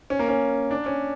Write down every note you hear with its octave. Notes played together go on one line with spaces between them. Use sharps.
C#4
A#3
C#4
D4
C#4